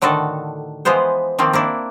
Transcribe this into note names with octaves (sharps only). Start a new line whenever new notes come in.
A2 D3 D#3 F#4 A4
E3 F3 G#3 B3 C5
D#3 F3 A#3 C4
A#3 D4 E4